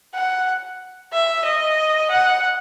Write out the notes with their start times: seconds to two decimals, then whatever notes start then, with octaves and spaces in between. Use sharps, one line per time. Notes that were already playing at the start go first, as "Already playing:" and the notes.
0.15 F#5
1.13 E5
1.45 D#5
2.11 F#5